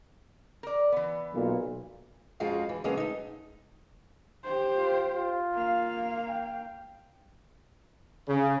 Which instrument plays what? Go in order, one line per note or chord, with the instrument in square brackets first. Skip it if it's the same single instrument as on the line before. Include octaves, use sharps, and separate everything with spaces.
[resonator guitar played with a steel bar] A#4 D5
E3 B3
[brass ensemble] B1 A#2
[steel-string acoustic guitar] F2 F3 G#3 C#4 F4 F#4
E3
D3 F#3 G#3 A#3 B3 C#4
A3 D#4
[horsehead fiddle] G4 C5
[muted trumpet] F4
F4
[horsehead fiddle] A#3 F5
[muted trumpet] G5
[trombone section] C#3